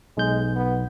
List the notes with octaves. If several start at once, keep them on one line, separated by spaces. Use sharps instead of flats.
B1 G#3 G6
B3